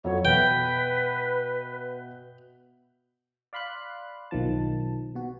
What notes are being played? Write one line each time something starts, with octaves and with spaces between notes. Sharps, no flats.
F2 F#3 A4 C#5
B2 B4 E5 G5
D5 F5 B5 C6 F#6
B1 D#3 F3 A5
B2 F#4